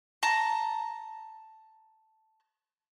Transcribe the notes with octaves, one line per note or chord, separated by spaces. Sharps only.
A5 A#5